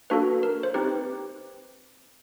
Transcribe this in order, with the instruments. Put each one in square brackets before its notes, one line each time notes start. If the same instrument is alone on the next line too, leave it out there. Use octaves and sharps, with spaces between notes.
[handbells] A#3 D4 F#4 A4 B4
A#4
C5
C4 D#4 G4 B4